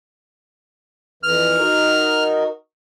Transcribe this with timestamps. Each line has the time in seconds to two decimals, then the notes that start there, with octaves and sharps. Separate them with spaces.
1.23 F2 E3 F6
1.58 D#4 F#4 A#4